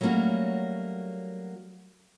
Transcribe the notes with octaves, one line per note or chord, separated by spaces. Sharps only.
F#3 G3 A3 A#3 C#4 F#4